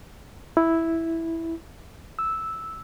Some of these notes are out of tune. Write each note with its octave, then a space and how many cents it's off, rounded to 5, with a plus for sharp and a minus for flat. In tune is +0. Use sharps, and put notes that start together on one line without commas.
E4 -5
E6 -5